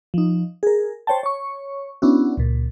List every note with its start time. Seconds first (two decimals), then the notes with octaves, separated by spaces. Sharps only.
0.14 F3 D#4
0.63 G#4 A#4
1.07 C5 C#5 G5 A5
1.23 C#5 C#6
2.02 B3 C#4 D4 E4 F#4
2.38 C#2 A#2